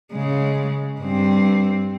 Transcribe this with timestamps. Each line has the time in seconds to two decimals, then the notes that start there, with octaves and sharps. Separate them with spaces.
0.12 C#3 G#3
1.01 G2 C4